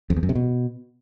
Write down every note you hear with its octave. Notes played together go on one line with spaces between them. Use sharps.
F2
E2
F#2
C3
B2